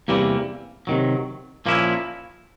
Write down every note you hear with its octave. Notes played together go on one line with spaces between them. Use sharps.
E2 C3 E3 G3 A#3
C3 D#3 F#3
A#2 F3 A#3 C#4 E4